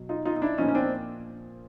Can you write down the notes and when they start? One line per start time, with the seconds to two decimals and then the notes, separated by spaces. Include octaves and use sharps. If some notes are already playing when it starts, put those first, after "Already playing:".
Already playing: B2 F#3
0.09 D#4 F4
0.25 D#4 F4
0.36 D#4
0.42 D4 E4
0.58 A#2 F3 C#4 D#4
0.69 C#4
0.75 C4 D4